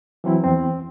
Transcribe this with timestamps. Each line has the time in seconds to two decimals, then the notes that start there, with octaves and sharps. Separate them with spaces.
0.24 E3 F#3 C4 E4
0.44 E2 C4